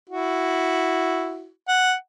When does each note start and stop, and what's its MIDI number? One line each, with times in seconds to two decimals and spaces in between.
0.09 1.48 64
0.09 1.48 66
1.68 1.93 78